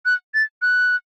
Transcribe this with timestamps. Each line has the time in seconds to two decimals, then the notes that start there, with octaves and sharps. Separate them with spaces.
0.06 F#6
0.34 A6
0.62 F#6